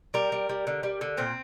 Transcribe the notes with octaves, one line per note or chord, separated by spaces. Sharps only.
G3 A#4
G3
G3
D3
G3
D3
A#2 C4